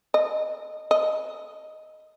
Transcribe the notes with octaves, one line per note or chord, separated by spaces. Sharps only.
D#5
D#5